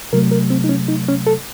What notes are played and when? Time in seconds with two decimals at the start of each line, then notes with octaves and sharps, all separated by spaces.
0.13 C3 F#3 A3 A#4
0.31 A#4
0.50 C4
0.64 D#4
0.69 C#4
0.88 D#4
1.09 C#4
1.27 A4